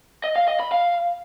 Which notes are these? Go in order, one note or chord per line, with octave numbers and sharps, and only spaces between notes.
D#5
F5
D#5
B5
F5